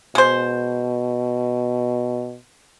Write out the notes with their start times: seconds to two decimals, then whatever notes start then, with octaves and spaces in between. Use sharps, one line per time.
0.15 B2 G#3 C5